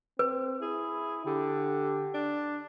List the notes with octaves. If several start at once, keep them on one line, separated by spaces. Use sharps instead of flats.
C4 B4
E4 G#4
D3 G4
D4